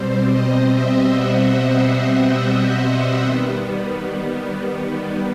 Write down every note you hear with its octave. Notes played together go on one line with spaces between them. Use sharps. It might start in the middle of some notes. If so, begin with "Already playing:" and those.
Already playing: B2 G3 C4 C5
D#5
E5
F#5
D#5
D#3 G3 B3